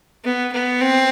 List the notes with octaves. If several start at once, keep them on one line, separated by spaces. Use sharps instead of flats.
B3
B3
C4